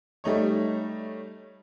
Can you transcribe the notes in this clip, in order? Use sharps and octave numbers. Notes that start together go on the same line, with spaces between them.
G3 A3 D#4 C#5